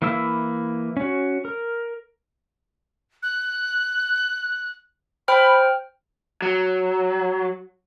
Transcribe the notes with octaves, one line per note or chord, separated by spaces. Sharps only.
E3 A#3 E4 E6
C#4 F#4
A#4
F#6
C5 G5 B5 F6
F#3